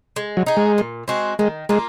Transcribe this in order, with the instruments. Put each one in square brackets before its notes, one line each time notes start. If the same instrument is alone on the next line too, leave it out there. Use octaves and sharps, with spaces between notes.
[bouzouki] G#3
[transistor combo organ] F#3
[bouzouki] D#4 G#4
[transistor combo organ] G#3
[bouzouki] A#2
G#3 C4 F#4
[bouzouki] D#3 [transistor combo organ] G#3
[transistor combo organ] G#3 [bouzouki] A#3 F4